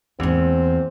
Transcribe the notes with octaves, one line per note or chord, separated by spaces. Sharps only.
E2 G#2 A#3 C4